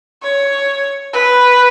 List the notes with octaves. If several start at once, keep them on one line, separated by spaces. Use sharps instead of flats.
C#5
B4